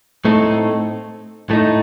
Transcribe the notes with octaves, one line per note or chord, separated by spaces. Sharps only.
A2 A3 C4 D#4 A4
A2 A3 D#4